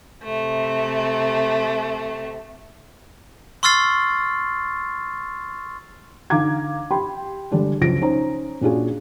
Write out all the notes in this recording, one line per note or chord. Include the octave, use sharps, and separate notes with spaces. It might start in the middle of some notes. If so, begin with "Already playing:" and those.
C3 A3
C6 C#6 E6 F6 A6 C7
D3 D#4 F5 A#5 D6 G#6
G4 G5 B5 C6
D3 G3 G#3 D4
C#2 F3 F#3 A#6 D7
C#4 D#4 C5 A#5
A#2 C#4 D4 F4 F#4 G#4